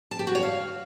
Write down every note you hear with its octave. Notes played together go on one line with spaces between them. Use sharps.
A5
G4
F#4
C#5
F5